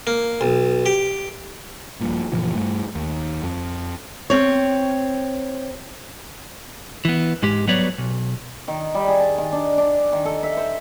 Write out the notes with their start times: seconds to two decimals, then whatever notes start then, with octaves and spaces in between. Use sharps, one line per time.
0.07 A#3
0.41 B1
0.86 G4
2.01 A#1 G2 A#2
2.32 F#1 A#2 E3 F3
2.55 G2 A3
2.95 D#2
3.43 F2
4.30 C4 C#5
7.05 E3 B3
7.42 G#2 G#3 G4
7.67 F#3 G3 B3 B4 C#5 D5
7.98 B1
8.68 D#3
8.95 G3
9.08 G#4
9.20 A5
9.38 D#3
9.53 D4
9.78 D4
10.13 D#3
10.25 A4
10.43 E5
10.57 C5